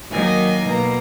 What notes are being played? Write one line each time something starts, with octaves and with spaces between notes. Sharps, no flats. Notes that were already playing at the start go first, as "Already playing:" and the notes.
D#3 F#3 A#3 D#4 G#5
B2 A#3 A#5